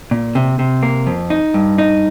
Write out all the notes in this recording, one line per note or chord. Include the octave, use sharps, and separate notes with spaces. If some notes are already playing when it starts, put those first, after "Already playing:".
A#2
C3
C3
A#3
F2
D#4
G2
D#4